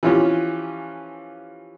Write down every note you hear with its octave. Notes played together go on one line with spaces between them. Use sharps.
E3 F3 C#4 F4 G4